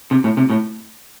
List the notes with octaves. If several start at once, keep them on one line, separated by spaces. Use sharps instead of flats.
C3
A2
C3
A2